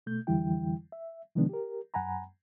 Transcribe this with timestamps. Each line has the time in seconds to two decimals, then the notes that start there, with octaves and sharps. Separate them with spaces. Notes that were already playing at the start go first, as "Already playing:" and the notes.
0.06 B2 A3 G6
0.27 F2 D3 E3 G3 E4 G5
0.92 E5
1.35 C3 D#3 F3 G#3 B3 D4
1.49 G4 A#4
1.94 F#2 F#5 G#5 A#5 B5